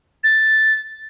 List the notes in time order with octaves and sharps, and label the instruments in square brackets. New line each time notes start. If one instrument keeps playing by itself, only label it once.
[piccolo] A6